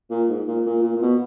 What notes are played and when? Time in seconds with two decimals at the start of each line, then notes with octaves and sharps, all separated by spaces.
0.11 A#2
0.29 G#2
0.47 A#2
0.66 A#2
0.83 A#2
0.96 A#2
1.02 B2